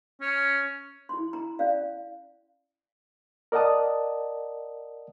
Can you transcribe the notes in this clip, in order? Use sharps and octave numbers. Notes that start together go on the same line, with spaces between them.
C#4
E4 C6
A#5
C#4 D5 F5
A#4 D5 D#5 F#5 A5 D#6